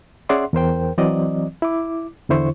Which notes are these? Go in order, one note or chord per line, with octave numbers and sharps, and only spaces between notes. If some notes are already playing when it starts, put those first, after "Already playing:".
C#4 G#4 D5 E5 F#5 C6
E2 A#4 C5 G5
E3 F#3 C4 D5 D#5
E4 D6
E2 D3 E4 C5 C#6